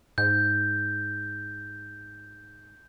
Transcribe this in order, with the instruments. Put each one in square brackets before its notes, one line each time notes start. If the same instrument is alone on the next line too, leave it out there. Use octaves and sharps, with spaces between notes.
[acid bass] G#2 [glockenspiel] G6